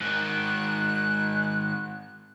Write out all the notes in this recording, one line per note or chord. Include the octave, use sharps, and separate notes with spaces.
G#2 D#3 F#6